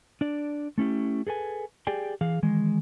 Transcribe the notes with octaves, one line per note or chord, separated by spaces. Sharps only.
D4 D5
A3 C#4 E4 G4
G#4 A4 B4 G#5
G4 G#4 D5 G5 G#5
E3 G#4 F5
D#3 E3 G#3